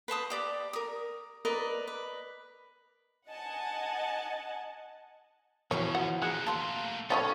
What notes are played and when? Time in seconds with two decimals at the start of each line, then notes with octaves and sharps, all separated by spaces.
0.08 B4 C5 A5 D#6
0.30 G4 D5 D6
0.73 A#4 D#6
1.45 A#4 B4 D5 D#5
1.87 B4
3.28 D#5 F#5 G#5 A5
5.71 E2 B2 E3 F3 C#5
5.95 F#5
6.22 A3 A#3 G#4 F#6 C#7
6.47 F5 A5 C6
7.10 D3 F3 C#4 G4 C#5 C#6 A6